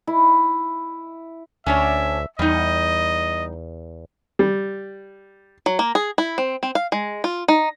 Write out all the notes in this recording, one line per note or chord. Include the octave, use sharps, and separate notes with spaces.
E4
D2 C#4 D4 C#5 E5
E2 G3 D#4 D#5
G3
F#3
A#3
G#4
E4
C4
C4
F5
G#3
F4
D#4